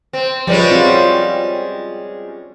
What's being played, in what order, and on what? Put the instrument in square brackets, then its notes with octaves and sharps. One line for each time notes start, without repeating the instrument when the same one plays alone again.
[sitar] C4
[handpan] F3 B4 C#5 [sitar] G3 G#3 C#4
[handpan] C4 F4 F#4